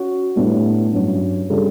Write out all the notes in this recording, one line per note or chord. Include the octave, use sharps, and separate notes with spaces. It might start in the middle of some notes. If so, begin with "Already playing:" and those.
Already playing: C#4 F#4
A2 G3 B3 D4
G2 F#3 C#4
C#3 G3 D4 A4